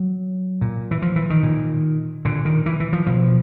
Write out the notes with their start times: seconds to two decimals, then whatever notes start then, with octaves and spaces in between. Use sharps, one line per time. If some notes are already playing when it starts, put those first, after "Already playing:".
Already playing: F#3
0.61 A#2
0.91 E3
1.02 F3
1.16 E3
1.30 D#3
1.43 A#2
2.25 A#2 D3
2.45 D#3
2.66 E3
2.80 E3
2.93 F3
3.06 B2 F3